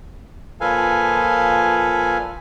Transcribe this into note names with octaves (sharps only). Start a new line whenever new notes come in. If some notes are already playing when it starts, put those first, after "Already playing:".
A#2 F3 A4 B4 F5 G#5